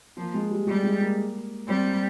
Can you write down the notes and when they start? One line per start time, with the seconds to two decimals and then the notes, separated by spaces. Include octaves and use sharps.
0.17 F3 A#3
0.34 G#3
0.51 G3
0.67 G3 G#3
0.84 G#3
1.01 A#3
1.68 G3 C4
1.85 A#3